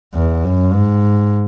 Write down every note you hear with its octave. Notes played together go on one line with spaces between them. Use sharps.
E2
F#2
G#2